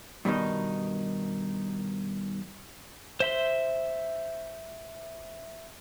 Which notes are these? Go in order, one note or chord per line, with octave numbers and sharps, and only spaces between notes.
G2 B2 D#3 D#4
C5 E5 C6